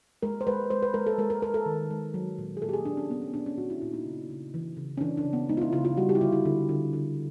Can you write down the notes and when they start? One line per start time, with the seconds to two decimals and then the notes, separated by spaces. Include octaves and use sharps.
0.23 G#3 A#4
0.41 C5
0.47 G#3 B4
0.70 G#3 C5
0.82 B4
0.94 G#3 A#4
1.07 A4
1.18 G#3 A#4
1.30 A#4
1.42 G#3 A#4
1.54 A4
1.66 D#3
1.91 G#3
2.14 F#3
2.38 A#2
2.57 G#4
2.62 A#2 A4
2.69 G4
2.73 G#4
2.85 A#2 D4
2.97 C#4
3.10 A#2 B3
3.22 C#4
3.33 A#2 D4
3.46 C#4
3.57 A#2 F#4
3.70 E4
3.82 A#2 E4
3.94 D#4
4.06 C#3
4.30 C#3
4.54 E3
4.77 C#3
4.97 C#4
5.01 E3 D4
5.17 D4
5.25 C#3
5.33 B3
5.49 G#3 D#4
5.57 F4
5.62 E4
5.73 C#3 F4
5.85 F4
5.97 G3 F#4
6.09 G4
6.15 E4
6.21 D3 F4
6.33 E4
6.45 D3
6.69 D3
6.93 D3